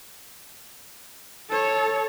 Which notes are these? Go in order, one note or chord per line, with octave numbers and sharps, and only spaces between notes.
A4 C#5